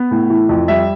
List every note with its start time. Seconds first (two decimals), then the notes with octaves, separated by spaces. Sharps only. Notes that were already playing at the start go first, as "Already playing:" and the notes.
Already playing: B3
0.11 A2
0.30 E3
0.49 F2
0.68 G3 E5